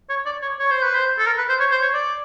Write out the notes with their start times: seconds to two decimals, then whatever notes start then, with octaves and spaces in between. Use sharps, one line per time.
0.09 C#5
0.26 D5
0.42 C#5
0.59 C#5
0.71 C5
0.83 B4
0.95 C5
1.18 A4
1.26 A#4
1.38 B4
1.49 C5
1.60 C#5
1.71 C5
1.82 C#5
1.93 D5